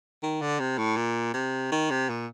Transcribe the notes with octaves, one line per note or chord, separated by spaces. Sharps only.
D#3
D3
C3
A2
A#2
C3
D#3
C3
A#2